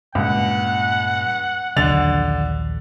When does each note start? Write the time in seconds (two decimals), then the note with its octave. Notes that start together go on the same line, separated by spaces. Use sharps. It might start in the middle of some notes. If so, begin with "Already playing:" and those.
0.15 C#2 G2 A#2 F#5
1.76 A#1 D#2 D3 F#3 A6 F7